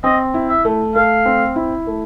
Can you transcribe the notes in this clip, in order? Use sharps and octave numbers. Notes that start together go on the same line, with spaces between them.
C4 D#5
E4
E5
A3
A3 F5
C4
E4
A3